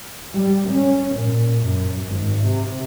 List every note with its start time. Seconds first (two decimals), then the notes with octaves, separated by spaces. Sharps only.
0.34 G3
0.69 C#4
1.15 A#2
1.63 F#2
2.08 G#1
2.45 C3